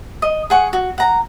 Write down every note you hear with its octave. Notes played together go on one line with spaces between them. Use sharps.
D#5
G#4 F#5 C#6
F#4
F#5 A#5